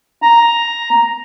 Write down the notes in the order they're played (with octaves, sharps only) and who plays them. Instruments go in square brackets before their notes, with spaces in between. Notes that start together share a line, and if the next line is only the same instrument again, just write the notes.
[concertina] A#5